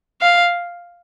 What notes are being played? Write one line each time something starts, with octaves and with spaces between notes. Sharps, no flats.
F5